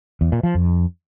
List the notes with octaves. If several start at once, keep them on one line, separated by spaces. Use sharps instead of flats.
E2
A#2
F3
F2